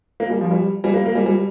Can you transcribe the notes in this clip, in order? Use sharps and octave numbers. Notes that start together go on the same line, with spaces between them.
A#3
G3
F3
G3
G3
A#3
A#3
G3
G3